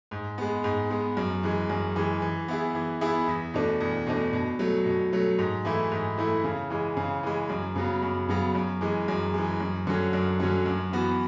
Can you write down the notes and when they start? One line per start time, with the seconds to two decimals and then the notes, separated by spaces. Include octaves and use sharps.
0.11 G#2
0.38 G#3 B3
0.64 G#2
0.90 G#3 B3
1.17 F#2
1.43 E3 G#3
1.70 F#2
1.96 E3 G#3
2.22 E3
2.48 B3 E4 G#4
2.75 E3
3.01 B3 E4 G#4
3.28 E2
3.54 B2 A3 D4
3.81 E2
4.07 B2 A3 D4
4.33 B2
4.59 F#3 A3
4.86 B2
5.13 F#3 A3
5.38 G#2
5.65 E3 A3 E4
5.92 G#2
6.18 E3 A3 E4
6.44 C#3
6.70 E3 G#3
6.97 C#3
7.23 E3 G#3
7.49 F#2
7.76 C#3 F#3 B3
8.02 F#2
8.29 C#3 F#3 B3
8.55 F#2
8.81 E3 G#3
9.08 F#2
9.34 E3 G#3
9.60 F#2
9.87 D3 F#3 C#4
10.13 F#2
10.40 D3 F#3 C#4
10.66 F#2
10.92 E3 B3 F#4